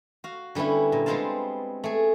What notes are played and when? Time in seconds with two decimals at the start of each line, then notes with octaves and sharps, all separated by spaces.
0.24 F#4 F5
0.55 D3 G3 B3 C#4 E4
0.92 A#2
1.06 G3 G#3 B3 C4 F5 A5
1.84 A3 G#4